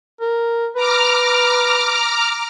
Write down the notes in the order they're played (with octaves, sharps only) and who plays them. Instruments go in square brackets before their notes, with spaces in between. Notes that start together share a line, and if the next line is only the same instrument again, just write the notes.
[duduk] A#4
[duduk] B4 [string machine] A#5 D6 F6